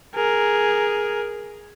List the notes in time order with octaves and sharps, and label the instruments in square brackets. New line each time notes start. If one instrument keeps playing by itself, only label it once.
[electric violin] G#4 A#4